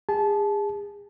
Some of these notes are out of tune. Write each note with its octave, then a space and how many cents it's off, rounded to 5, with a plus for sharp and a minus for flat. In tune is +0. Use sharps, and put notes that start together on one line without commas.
G#4 -30 A5 -25